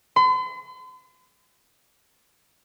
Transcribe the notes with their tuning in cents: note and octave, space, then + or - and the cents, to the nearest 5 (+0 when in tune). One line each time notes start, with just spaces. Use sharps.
C6 -45